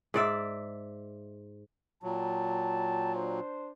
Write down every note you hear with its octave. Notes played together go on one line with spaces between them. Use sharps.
G#2 D5 E5
A#2 F#3 G5 A5
D4 C5